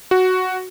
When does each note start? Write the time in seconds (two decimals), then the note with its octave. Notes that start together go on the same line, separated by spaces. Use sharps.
0.11 F#4